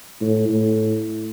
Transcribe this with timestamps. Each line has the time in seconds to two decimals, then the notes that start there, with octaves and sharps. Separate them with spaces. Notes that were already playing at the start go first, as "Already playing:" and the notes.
0.21 A2
0.49 A2